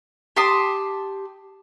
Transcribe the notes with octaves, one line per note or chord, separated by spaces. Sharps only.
G4 A5 C6 D#6